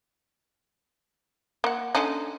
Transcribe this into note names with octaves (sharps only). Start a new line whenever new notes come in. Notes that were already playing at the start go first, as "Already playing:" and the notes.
A#3 F#5
D3 C#4 D#4